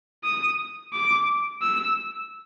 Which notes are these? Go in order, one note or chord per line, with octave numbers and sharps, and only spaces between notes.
D#6
D6
E6